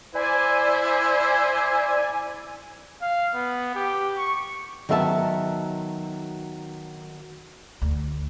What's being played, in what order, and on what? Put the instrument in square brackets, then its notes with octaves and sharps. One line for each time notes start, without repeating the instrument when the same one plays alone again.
[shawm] E4 [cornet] C5 [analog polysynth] D5 G#5
[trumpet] F5
B3
G4
C#6
[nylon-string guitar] D#3 F#3 B3 E5 F5 A5
[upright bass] D2